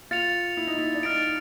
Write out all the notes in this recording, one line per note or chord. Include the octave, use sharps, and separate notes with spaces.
F4 A6 C#7 F7
E4
D#4
E4
D4
D#4 F6 A6 D7